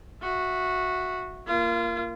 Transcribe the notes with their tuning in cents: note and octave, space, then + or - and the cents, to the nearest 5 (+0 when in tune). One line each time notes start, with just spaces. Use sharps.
F#4 -10 E5 +0
A#3 +0 F4 -30